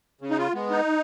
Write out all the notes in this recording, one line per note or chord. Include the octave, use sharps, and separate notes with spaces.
C#3
D#4
F4
G#3 B3
D#4